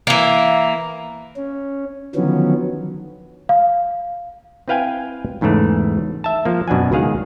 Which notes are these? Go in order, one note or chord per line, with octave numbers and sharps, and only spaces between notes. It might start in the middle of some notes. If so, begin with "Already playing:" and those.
E3 A#3
C#4
D3 D#3 F3 F#3 B3 C#4
F5
C4 E4 B4 F5 G5 G#5
E2 G#2 C#3 E3 A3
E5 A5
F3 A#3
F#2 B2 D4 F#5 G#5
C#2 D#3 G#4 F5 F#5